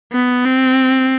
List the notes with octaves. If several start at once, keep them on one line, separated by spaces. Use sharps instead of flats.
B3
C4